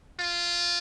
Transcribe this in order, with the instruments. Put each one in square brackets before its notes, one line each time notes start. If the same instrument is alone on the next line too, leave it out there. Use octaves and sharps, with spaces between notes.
[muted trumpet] F4